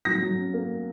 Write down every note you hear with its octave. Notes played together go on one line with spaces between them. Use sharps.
F#3 A#6
F#3
C#4
A#3